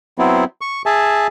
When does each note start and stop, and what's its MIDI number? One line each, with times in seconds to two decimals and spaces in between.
0.19 0.44 54
0.19 0.44 59
0.19 0.44 60
0.19 0.44 64
0.61 0.82 85
0.86 1.27 68
0.86 1.27 76
0.86 1.27 80
0.86 1.27 81